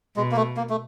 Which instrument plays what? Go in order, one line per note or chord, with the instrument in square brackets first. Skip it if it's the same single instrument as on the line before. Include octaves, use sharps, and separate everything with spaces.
[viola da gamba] B2 [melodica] G#3
[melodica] A#3
A3
A#3
A3